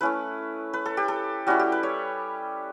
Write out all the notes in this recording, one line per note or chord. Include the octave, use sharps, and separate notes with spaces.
A3 C#4 E4 B4
B4
A4
G4
A4
G3 C#4 E4 F#4
G4
B4
C#5